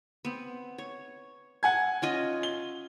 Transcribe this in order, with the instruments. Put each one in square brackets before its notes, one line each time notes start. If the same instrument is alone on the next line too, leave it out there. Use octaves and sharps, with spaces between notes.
[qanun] B3 C4
C#5
[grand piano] F#5 G#5 G#6
[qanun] C#4 F4 D#5
[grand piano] G7